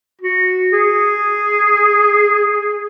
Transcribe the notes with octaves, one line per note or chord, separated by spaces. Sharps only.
F#4
G#4